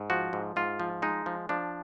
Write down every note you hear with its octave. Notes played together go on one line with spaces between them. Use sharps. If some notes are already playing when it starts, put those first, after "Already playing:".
Already playing: G#2
F3 F#4
G#2
G#2 F4
F3
G#3 D#4
F3
F3 D4